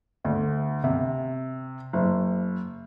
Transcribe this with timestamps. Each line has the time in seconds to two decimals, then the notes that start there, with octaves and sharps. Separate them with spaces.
0.25 D2
0.84 C3
1.93 F#1